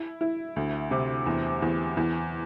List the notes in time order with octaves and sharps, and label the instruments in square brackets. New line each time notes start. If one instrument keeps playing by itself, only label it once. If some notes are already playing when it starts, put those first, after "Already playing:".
Already playing: [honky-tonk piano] E4
E4
D2
C3
E2
E2
E2